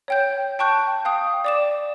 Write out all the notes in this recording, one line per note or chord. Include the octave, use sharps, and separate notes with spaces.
C#5 G5 G6
G5 A5 C#6 F#6 G6
F5 G5 D#6
D5 D6 E7